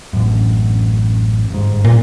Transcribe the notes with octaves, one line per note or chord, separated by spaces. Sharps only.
A1 F#2
G1 G#2
A#2